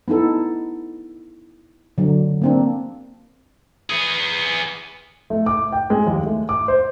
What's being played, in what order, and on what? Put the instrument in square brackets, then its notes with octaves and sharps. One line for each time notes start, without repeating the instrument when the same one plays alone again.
[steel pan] B3 D#4 E4 A4
D3 F#3
A#3 C4 D4
[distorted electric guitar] B3 G#4
[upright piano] A3
D6
G5
G#3
D#2
A3
D6
C5